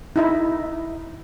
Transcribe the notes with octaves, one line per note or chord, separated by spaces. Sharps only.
D#4 E4